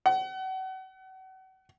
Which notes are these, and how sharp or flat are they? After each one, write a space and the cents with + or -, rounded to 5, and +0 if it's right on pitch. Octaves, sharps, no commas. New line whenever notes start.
F#5 +35